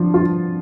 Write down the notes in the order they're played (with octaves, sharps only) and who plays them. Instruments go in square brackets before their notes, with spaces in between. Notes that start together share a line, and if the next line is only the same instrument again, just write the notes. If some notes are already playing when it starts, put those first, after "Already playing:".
Already playing: [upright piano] F3 D4
F4